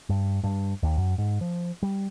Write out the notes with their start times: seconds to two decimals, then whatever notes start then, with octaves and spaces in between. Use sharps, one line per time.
0.09 G2
0.44 G2
0.83 D#2
0.97 F#2
1.18 G#2
1.41 F3
1.83 G3